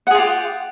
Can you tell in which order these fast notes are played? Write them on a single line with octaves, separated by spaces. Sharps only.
F#5 G#4 F4 G4